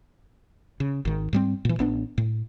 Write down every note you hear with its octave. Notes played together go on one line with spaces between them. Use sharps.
C#3
G#1 D#3
G#2 G3 C4
A#2 E3
A1 B3 D4
A2